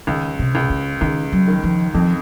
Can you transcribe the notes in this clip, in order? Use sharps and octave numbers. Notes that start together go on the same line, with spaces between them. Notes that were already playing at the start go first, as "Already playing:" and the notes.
C#2 D#3
C3
C#2
C#3
C#2 D#3
F#3
D#3
F3
F2 F3